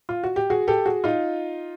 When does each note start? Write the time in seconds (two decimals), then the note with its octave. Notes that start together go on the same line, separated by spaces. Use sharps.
0.09 F4
0.24 F#4
0.36 G4
0.50 F#4 G#4
0.68 G4 A4
0.86 F#4 G#4
1.04 D#4 F4